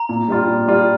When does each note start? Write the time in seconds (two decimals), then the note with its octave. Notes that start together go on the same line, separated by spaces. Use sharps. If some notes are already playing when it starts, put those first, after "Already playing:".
Already playing: A#5
0.09 A#2
0.28 G3 D4 F4
0.48 A#2
0.67 G3 D4 F4